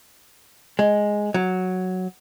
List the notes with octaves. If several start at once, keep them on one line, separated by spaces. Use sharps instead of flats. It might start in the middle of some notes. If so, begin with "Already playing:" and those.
G#3
F#3